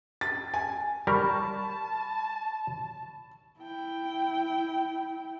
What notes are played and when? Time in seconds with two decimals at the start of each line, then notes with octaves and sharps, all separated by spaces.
0.21 A6
0.54 G#5
1.07 G3 A#4 A5 B5 C#6
3.60 E4 G5